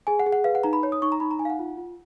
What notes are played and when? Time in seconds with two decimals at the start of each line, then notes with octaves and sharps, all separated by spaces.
0.07 G#4 G#5
0.19 F#5
0.26 G#4
0.32 F#5
0.44 B4 F5
0.55 F#5
0.64 D#4 A#5
0.73 B5
0.83 C#5
0.92 D#6
1.02 D#4 C#6
1.12 A#5
1.20 D#4 B5
1.31 A#5
1.39 D#4 G#5
1.45 F5
1.50 F#5
1.59 F4
1.77 F4